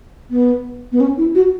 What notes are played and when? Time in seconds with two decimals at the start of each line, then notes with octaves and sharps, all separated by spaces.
0.30 B3
0.92 B3
1.00 C#4
1.18 E4
1.35 F#4